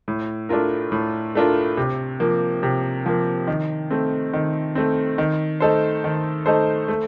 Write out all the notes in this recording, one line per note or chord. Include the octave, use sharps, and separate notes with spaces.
A2
A3 D4 F4 A#4
A2
A3 D4 F4 A#4
C3
F3 A#3
C3
F3 A#3
D#3
A3 C4
D#3
A3 C4
D#3
A3 D#4 A4 C5
D#3
A3 D#4 A4 C5
A3